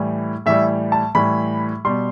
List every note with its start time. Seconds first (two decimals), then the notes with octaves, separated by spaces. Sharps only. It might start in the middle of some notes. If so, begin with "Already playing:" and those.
Already playing: A2 E3 G3
0.46 A2 E3 G3 E5
0.92 A5
1.15 A2 E3 G3 B5
1.85 B2 G3 C6